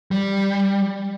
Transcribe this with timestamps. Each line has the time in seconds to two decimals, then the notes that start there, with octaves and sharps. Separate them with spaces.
0.11 G3